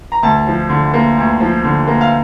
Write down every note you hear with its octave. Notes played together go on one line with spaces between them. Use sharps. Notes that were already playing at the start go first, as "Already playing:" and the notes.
A#5
D2 A5
F3
D3
A#3
D2
F3
D3
A#3
F5